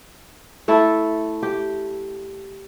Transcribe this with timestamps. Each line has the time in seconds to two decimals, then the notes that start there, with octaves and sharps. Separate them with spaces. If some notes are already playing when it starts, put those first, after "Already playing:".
0.68 A3 E4 A4
1.43 G4